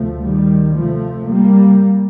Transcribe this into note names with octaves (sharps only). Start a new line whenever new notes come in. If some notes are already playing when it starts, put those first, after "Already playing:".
Already playing: D2 C3 F3 A3
D#3 G3
F2 C3 F3 A3
G3 A#3